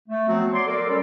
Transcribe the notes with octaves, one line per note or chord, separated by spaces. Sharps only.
A3
F3 F#3 B3 C4 F#4
C#5 D5 C6
A4 A#4 D5
F#3 G3 C#4 A4